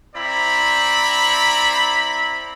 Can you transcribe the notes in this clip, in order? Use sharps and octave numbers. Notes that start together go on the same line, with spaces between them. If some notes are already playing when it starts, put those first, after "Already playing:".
C4 E4 D5 A#5 B5